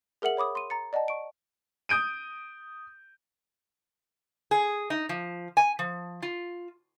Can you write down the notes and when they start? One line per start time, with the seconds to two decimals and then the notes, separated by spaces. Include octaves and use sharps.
0.22 G#4 A#4 E5 F#5 F#7
0.37 C#5 B5 D6 D#6
0.55 C6 D#7
0.70 A#5 A6 C#7
0.93 D5 D#5 F#5 A5
1.08 C#6 D7
1.89 D#6 G6 D7 D#7
4.51 G#4
4.90 D#4
5.09 F3
5.57 G#5
5.79 F3
6.22 F4